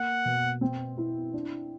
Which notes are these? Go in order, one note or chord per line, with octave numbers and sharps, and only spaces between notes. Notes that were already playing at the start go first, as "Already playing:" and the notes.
Already playing: A#3 F#5
B2
C4
E4
D4